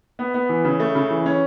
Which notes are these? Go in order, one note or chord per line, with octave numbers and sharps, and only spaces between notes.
B3
B3
E3
C#3
A3
C#3
E3
C#4